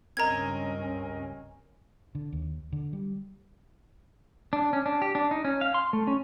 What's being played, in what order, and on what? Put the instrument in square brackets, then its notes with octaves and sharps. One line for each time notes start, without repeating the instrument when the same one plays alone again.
[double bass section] C#2 G2 C#4 [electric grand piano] C4 A#4 D#5 [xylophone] A#5 G#6
[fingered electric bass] D3
D#2
D3
G3
[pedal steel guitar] D4
C#4
D4
G4
D4
D#4
C#4
F5
C6
A3
C#4